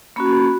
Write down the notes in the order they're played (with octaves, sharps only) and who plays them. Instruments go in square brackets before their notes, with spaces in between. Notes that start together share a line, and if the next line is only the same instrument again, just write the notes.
[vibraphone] A#3 C#4 F#4 B5